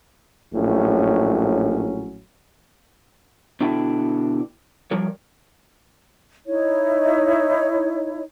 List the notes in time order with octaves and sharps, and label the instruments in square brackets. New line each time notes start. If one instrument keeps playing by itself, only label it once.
[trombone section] A#1 A2 F#3 C#4
[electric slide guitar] B2 D3 D4 E4 G5
F3 G3 A#4 C#5
[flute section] D#4 E4 C#5